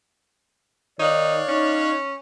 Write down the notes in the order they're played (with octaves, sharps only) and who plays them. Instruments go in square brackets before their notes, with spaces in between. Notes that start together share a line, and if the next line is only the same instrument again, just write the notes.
[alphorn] D#3 [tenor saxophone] D#4 [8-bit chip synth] C#5 F5 F#6 [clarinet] D5
[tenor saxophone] C#4 [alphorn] D#4